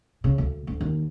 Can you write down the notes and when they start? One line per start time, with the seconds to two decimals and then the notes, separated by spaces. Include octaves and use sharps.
0.24 C#3
0.38 D2
0.67 D2
0.81 D#2